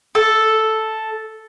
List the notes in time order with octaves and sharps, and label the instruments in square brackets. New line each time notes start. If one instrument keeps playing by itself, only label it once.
[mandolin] A4